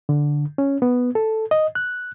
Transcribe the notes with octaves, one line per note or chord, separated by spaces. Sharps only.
D3
C#4
B3
A4
D#5
F#6